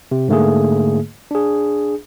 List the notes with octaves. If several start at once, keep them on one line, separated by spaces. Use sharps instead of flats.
C3
G#2 D3 A3 A#3 G#4
D4 G#4